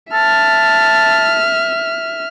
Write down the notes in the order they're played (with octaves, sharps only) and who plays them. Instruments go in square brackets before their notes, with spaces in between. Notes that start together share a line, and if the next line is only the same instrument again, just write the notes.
[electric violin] E5 F6 [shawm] A5